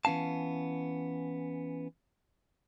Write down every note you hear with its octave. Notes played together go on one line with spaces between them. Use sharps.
E3 B3 C#4 F5 A5